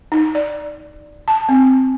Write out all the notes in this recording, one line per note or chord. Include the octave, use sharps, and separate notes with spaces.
D#4
D5
A5
C4